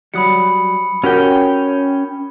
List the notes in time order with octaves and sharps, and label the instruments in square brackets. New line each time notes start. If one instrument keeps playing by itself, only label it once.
[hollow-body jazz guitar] F#3 G3 [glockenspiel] B5 D#6 C#7
[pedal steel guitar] C#4 G5 [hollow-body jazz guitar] F#4 G4 A#4